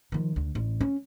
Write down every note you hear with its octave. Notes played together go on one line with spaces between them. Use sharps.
D#3 F3
D2
A1
C#4